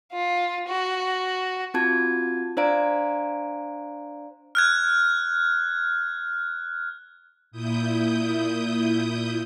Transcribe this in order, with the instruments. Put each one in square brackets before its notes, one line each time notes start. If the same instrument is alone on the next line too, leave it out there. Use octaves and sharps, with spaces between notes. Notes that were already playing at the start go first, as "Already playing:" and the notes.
[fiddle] F4
F#4
[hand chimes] C4 F4 F#4 A5 G#6
D4 C5 D5 F5 A#5 D7
[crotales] F6 F#6 G#6
[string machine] A#2 E4 D#6 G6